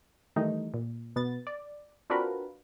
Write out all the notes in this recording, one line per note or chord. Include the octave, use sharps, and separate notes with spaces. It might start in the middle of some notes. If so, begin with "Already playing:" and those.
D#3 E3 G3 A3 D#4
A#2
B2 B3 A6
D5
C4 D4 F4 F#4 A#4 B4